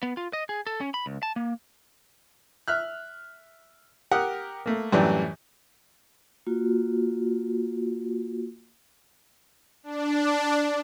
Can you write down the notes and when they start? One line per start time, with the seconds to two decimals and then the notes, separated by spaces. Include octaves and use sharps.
0.03 B3
0.17 F4
0.33 D#5
0.49 G#4
0.67 A4
0.81 C#4
0.94 B5
1.06 C#2
1.23 A5
1.36 A#3
2.68 E5 F6 F#6
4.11 G4 A#4 F#5 D#6
4.66 A3 A#3
4.92 F#2 A2 E3 G3 D4
6.47 A#3 F4 F#4
9.83 D4